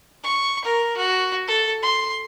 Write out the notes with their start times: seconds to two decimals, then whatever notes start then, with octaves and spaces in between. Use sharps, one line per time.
0.23 C#6
0.65 A#4
0.96 F#4
1.48 A4
1.82 C6